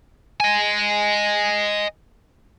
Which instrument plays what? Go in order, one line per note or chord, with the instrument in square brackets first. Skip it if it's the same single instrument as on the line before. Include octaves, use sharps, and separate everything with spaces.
[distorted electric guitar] D#5 G#5